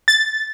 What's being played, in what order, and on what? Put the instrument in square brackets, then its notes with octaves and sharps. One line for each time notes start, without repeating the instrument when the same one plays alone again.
[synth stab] A6